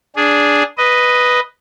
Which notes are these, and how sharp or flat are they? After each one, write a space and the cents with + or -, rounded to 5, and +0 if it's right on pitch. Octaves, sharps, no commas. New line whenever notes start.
D4 -10 G#4 +0
B4 +0 D#5 +0